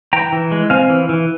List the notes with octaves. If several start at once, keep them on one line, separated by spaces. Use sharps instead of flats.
E3 G5 A#5
E3
G#3
C4 F5 G#5
E3
E3